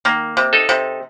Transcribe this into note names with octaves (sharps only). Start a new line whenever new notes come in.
D#3 A#3
C3
D#4 A4
C3